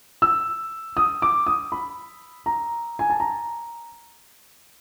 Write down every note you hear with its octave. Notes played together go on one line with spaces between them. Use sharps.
E6
D#6
D6
D#6
B5
A#5
G#5
A5
A#5